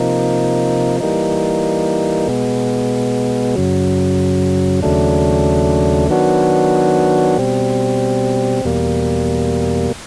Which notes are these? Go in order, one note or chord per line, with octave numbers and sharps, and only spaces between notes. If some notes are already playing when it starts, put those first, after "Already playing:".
Already playing: C3 F3 A#3 D#4
E3 G3 A#3 D#4
B2 G#3 B3
F#2 C#3 F#3
D#2 C#3 F#3 A3 D4
D#3 F#3 B3 D4 F#4
B2 G3 C4
E2 B2 G3 A#3